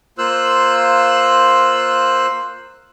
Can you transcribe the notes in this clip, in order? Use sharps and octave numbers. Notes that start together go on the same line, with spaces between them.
A#3 F4 C5 E6 F#6